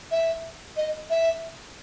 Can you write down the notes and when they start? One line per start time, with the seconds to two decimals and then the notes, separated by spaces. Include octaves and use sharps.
0.11 E5
0.77 D#5
1.10 E5